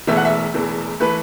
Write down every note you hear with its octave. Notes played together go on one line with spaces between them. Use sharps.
E1 E2 E3 A3 E5
F#5
E5
E1 E2 E3 A3
E3 A3 B4